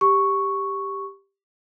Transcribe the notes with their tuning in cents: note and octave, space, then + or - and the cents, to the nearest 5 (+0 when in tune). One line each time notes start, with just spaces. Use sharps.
G4 +5 C#6 +0